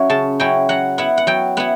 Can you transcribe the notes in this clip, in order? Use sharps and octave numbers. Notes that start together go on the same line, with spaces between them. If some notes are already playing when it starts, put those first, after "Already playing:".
Already playing: F#3 C#4 E4
C#3 A5
F#3 C#4 E4 G5
F#3 F#5
B3 E4 F#5
F#5
F#3 G5
B3 E4 F#5